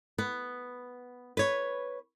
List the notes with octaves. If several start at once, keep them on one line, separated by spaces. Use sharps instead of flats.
B3
B4 C#5